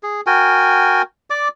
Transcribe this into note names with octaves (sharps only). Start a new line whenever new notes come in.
G#4
F#4 A#4 G5 G#5
D5 D6